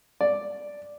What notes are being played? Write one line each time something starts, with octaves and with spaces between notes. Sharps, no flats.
D5